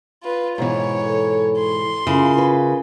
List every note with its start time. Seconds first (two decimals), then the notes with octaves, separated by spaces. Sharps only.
0.23 F4 B4
0.58 G#2 B2 E3 C#5
1.04 A4
1.59 C6
2.07 C#3 E4 F4 A#4
2.38 B4